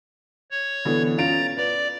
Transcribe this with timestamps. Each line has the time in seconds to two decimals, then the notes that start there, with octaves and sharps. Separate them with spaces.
0.51 C#5
0.85 B2 D3 E3
1.18 C#4 F4 A#5 A6 D7
1.57 B4 D5